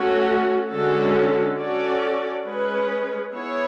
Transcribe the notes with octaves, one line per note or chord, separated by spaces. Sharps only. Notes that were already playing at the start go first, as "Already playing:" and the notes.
Already playing: A3 C#4 F#4
D3 G#3 C#4 F#4 A4
C#4 F#4 A4 D5
G#3 C#4 G#4 B4
B3 E4 G#4 C#5